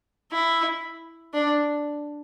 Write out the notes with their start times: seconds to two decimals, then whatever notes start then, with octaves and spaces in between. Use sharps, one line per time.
0.32 E4
1.34 D4